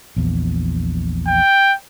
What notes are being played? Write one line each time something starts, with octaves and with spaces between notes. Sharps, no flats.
A#1 E2
G5